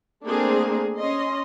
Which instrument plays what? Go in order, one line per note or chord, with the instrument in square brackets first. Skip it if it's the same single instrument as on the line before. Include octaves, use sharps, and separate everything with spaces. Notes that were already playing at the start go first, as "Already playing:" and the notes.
[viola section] A3 A#3 C4 D4 G#4 A#4
C#4 D#5 C6